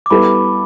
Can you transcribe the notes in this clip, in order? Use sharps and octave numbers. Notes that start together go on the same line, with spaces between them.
D6
G3 B3 E4 A4 B5